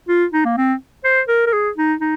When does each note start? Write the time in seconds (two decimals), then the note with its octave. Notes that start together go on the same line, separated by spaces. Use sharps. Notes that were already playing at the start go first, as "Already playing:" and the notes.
0.08 F4
0.33 D#4
0.45 A#3
0.57 C4
1.04 C5
1.28 A#4
1.46 A#4
1.53 G#4
1.77 D#4
2.01 D#4